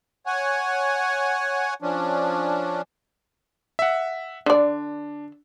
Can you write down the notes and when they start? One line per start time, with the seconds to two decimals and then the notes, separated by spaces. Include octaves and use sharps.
0.26 C#5 F#5 G#5
1.82 F3 C#4 D4
3.79 E5 F#5
4.46 D3 D4 D5